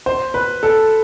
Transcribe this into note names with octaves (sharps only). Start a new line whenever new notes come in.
C5
B4
A4